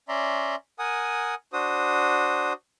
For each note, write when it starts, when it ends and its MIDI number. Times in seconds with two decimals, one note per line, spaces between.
0.09 0.55 61
0.09 0.55 74
0.09 0.55 76
0.09 0.55 82
0.09 0.55 84
0.79 1.35 70
0.79 1.35 78
0.79 1.35 80
0.79 1.35 87
1.53 2.53 62
1.53 2.53 66
1.53 2.53 72
1.53 2.53 87